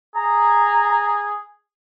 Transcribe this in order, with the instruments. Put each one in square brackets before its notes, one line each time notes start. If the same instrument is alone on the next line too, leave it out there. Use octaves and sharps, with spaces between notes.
[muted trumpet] G#4 [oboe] A#5